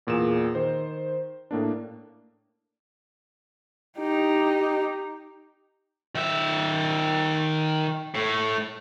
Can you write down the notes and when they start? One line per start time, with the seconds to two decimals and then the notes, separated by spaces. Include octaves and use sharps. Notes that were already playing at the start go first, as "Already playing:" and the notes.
0.07 E2 A#2 G#4 E7
0.55 D#3 C5
1.51 A2 A#3 D4
3.99 D#4 G4
6.15 D#3 E5
8.15 A2